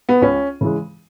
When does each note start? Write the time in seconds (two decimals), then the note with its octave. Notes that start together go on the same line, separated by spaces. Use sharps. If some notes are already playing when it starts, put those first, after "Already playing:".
0.09 B3
0.22 C#2 C#4
0.61 C#3 E3 G#3